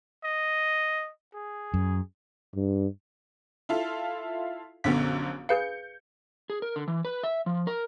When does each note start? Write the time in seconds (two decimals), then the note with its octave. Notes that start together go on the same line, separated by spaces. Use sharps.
0.24 D#5
1.34 G#4
1.74 F#2
2.55 G2
3.69 E4 F4 A4
4.84 A#1 F#2 D3 B3 B6
5.49 G#4 B4 F5 G6 C#7
6.50 G#4
6.62 A#4
6.76 D3
6.88 E3
7.05 B4
7.23 E5
7.46 F3
7.67 A#4